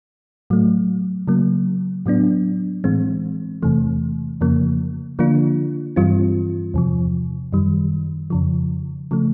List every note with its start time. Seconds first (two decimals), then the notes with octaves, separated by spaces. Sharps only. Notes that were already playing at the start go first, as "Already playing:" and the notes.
0.50 A2 F#3 A3
1.28 C#3 F#3 A#3
2.06 A2 F#3 B3 D4
2.84 A2 E3 G#3 C4
3.62 E2 C3 E3 A3
4.41 F2 C#3 F3 A#3
5.19 D3 F3 A#3 D4 F4
5.96 G2 E3 G3 C4 F4
6.74 E2 C3 F3
7.53 F#2 D#3 G3
8.30 F2 C#3 F3
9.11 C#3 F3 A3